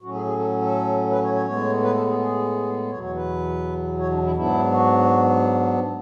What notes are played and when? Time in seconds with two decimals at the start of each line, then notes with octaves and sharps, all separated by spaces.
0.02 A2 F#3 C#4 F#4
0.14 G#4
0.26 G#4
0.38 A4
0.62 A4
1.11 B4
1.23 C#5
1.34 C#5
1.46 A2 G#3 B3 C#5
1.83 B4
1.94 A4
2.07 G#4
2.19 G#4
2.91 E2 B2 F#3 C#5
3.03 C#5
3.15 B4
3.99 C#5
4.11 D4
4.23 E4
4.35 G#2 F#3 B3 D4 E4
4.72 F#4